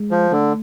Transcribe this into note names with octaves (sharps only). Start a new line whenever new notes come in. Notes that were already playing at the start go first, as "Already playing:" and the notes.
Already playing: G#3
F3
D3 A3